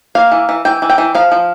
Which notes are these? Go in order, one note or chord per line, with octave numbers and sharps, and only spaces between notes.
A#3 F5
E3
E3
E3 G5
E3
G5
E3
F3 F5
F3